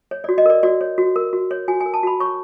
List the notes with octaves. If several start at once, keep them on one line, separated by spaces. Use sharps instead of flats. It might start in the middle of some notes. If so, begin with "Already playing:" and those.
C#5
F#4 D5
D#5
A#4 D5
F#4 D5
C#5
F#4
A#4
F#4
C#5
F#4 G#5
G#5
A#4
A5
F#4 B5
C#5 C#6